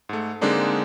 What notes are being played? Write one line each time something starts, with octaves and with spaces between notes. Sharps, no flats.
G#2 A3
D3 G#3 A#3 C4 D4 D#4